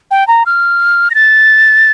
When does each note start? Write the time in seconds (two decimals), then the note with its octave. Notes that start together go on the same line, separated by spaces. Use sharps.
0.11 G5
0.28 A#5
0.46 F6
1.11 A#6
1.15 A6